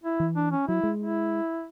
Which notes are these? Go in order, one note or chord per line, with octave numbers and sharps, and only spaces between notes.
E4
E3
D4
C#4
F#3 E4
G#3
E4